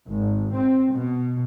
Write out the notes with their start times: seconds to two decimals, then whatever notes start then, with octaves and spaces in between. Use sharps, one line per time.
0.10 G#1
0.56 C4
0.94 B2